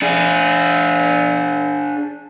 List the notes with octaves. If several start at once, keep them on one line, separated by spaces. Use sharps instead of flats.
D4 G#4